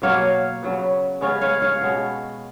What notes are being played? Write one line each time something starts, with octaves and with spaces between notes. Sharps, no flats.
B2 F#3 A#3 C#5 F5
C#3 F#3 B3
C#3 G#3 B3 C#5 F5
C#5 F5
C#5 F5
B2 G#3 B3